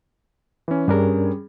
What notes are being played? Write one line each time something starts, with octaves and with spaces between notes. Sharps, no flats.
E3 C#4
G2 G3 C#4 D4 G#4 A#4